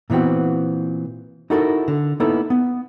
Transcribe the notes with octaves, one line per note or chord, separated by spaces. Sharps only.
A#2 E3 B3 C4 F#4
D#4 E4 F#4 A4 A#4
D3
A#3 B3 D#4 E4 A4
B3